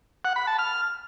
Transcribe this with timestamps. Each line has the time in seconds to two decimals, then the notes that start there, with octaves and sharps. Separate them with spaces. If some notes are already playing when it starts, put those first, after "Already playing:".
0.25 F#5
0.36 B5
0.47 A5
0.59 F6